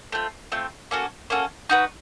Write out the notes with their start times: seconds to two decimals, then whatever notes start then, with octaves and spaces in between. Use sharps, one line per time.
0.12 A3 C4 F4
0.52 A3 C4 F4
0.91 A#3 C#4 F#4 A4
1.30 A#3 C#4 F#4 A4
1.69 D#4 F#4 B4